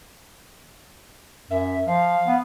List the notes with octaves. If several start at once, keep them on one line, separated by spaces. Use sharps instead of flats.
F#2 E5
F3 F5
B3